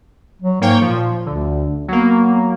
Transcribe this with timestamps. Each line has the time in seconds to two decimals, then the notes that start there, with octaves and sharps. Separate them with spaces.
0.42 F#3
0.61 G#2 A#3 C#5 G5
0.81 A#2 F3
1.26 D2 D3
1.88 F#3 A#3 B3